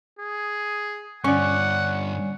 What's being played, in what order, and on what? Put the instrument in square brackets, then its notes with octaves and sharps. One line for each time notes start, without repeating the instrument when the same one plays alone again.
[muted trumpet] G#4
[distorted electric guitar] G2 D3 [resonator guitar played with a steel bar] C#4 [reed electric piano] D5 C#6 [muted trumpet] F#5